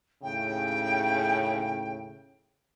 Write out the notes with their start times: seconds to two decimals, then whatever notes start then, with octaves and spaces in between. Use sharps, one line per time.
0.23 D#2 A2 C#3 G5